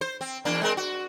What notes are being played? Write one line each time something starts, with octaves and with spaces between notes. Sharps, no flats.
C5
C4
E2 A#3 D4
G#3 C4 A#4
F#4